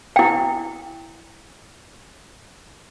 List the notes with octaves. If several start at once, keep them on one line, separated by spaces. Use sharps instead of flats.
E4 G5